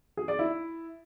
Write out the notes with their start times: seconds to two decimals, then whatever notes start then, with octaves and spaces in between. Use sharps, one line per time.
0.17 G#4
0.28 D5
0.39 E4